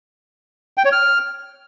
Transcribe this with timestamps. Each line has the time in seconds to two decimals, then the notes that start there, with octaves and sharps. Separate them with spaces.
0.77 G5
0.85 C#5
0.92 F6